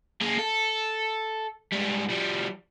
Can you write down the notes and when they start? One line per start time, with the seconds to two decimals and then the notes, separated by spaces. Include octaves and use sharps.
0.21 A#3 G#4
0.39 A4
1.72 G#2 G3
2.10 F3 G3